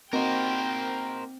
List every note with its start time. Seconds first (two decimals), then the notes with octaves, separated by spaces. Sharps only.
0.13 A#3 C4 D#4 F#4 A#4 C5 G5